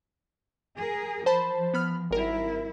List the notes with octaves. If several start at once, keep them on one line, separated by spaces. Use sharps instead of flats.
G#4 A#4
F3 C5 A5 B5
B3 B5 F6
G#1 G3 E4 A#4